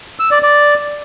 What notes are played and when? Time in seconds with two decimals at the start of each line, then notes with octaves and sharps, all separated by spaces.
0.20 E6
0.31 D5
0.43 D5